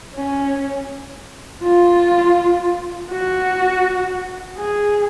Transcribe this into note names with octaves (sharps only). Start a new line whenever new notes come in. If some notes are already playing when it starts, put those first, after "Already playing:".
C#4
F4
F#4
G#4